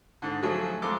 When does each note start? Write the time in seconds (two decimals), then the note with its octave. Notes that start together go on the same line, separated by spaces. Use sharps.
0.22 G#2 D3
0.42 F3 F#3 A3 F#4 G#4
0.82 F2 G#3 A4 C6 D6